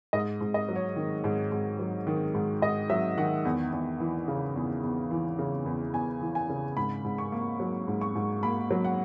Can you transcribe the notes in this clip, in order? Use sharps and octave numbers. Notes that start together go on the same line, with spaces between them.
G#2 D#5
G#2
D#5
F#3
C#5
D#3
G#2
G#2
F#3
D#3
G#2
G#2 D#5
F#3 E5
D#3 F#5
E2
E2
E3
C#3
E2
E2
E3
C#3
E2
E2 G#5
E3
G#5
C#3
G#2 B5
G#2
C#6
A#3
F#3
G#2
C#6
G#2
A#3 B5
F#3
F#5